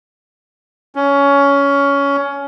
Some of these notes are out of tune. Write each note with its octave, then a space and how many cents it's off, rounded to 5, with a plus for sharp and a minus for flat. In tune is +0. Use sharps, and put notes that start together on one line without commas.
C#4 +15